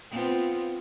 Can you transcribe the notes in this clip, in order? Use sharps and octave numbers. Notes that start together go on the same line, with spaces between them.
B3 C4 F4